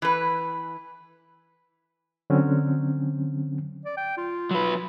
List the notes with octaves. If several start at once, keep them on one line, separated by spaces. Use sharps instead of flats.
E3 B4
D3 F#3 C4 C#4
D5
G5
F4
F#3 B4